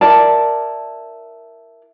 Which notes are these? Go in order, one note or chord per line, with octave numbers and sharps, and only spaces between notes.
E4 A#4 D5 A5